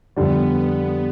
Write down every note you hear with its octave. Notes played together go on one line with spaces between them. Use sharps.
F2 D3 G3 B3